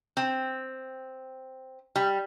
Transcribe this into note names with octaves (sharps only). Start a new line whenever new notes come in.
C4
G3